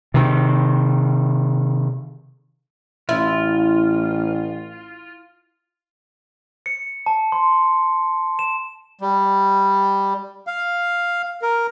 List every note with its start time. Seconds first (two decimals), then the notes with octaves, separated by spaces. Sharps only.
0.14 C3 D#3
3.09 A1 E4 F4
6.66 C#7
7.06 A5
7.32 C6
8.39 E7
9.01 G3
10.47 F5
11.42 A#4